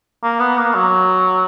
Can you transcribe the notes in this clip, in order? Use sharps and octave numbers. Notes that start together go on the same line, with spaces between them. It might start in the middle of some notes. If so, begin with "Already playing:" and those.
A#3
B3
A#3
F#3